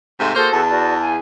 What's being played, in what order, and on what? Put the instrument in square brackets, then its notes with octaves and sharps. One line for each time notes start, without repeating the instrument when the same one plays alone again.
[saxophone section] G#2 C3 A3
[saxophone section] A#3 C5 [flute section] F#4 G#4 A4
[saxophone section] E2 [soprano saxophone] A5
[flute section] F#4 B4 D5
F5 G#5